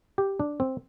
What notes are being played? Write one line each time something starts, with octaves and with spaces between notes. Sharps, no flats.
G4
D4
C4